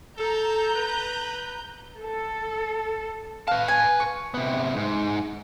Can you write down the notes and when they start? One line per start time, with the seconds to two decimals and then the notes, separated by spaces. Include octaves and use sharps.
0.18 A4 A#5 G6
0.75 B4
2.00 A4
3.48 B4 F5 A5
3.68 G#5
4.00 C#6
4.34 C3 B3
4.76 G#2